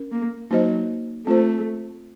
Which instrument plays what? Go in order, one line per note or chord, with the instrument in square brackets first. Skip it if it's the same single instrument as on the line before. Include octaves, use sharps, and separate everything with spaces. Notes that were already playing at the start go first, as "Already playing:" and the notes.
Already playing: [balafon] C#4 A#4
[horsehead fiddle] A#3
[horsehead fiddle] F#3 [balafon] A#3 D#4 F#4 C5 D#5
[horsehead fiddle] A3 [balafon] C4 F4 C5